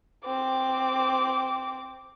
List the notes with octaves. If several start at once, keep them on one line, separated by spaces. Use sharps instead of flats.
C4 D6